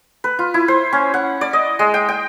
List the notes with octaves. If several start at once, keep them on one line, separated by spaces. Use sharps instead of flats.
B4
F4
E4
C5
C#4
F#5
D5
D#5
G#3
G5
G5